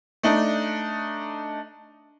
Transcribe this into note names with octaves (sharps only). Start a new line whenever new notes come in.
A3 D4 D#4